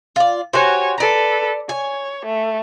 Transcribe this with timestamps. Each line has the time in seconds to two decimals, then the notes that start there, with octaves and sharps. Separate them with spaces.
0.16 F4 D5
0.53 F#4 G4 C5 C#5 G#5
0.98 A4 B4 D5 A#5
1.69 C#5 G#5
2.25 A3